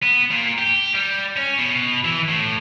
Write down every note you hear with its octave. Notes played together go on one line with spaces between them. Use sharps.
B3
A#2
G4
G3
C#4
B2
E3
A2